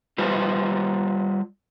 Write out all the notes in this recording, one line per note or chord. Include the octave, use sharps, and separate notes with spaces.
G3 F4 G4 B4 C5